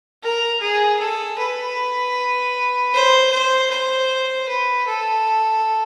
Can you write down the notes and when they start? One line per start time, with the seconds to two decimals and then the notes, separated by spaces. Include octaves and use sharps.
0.23 A#4
0.61 G#4
0.99 A4
1.38 B4
2.94 C5
3.31 C5
3.70 C5
4.48 B4
4.86 A4